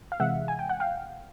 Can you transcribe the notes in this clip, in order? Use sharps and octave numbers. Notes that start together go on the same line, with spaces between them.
F5
C3 E3 G#3 E5 F#5
G#5
G5
F#5
F5 G5